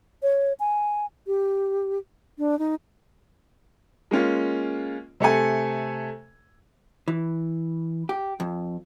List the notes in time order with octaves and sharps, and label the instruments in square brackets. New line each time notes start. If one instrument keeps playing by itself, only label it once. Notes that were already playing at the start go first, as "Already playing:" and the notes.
[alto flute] C#5
G#5
G4
D4
D#4
[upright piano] G#3 A#3 C#4 F4
C3 A3 A4 G#5
[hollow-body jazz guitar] E3
G4
F2